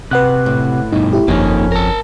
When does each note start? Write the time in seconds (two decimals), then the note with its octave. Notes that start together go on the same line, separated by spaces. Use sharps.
0.11 C3 B4 F#5 F#6
0.46 A2
0.92 G2 B2 D#4
1.13 E4 G4
1.28 G1 F2 A#3 C#4 D#4
1.72 A#4 A5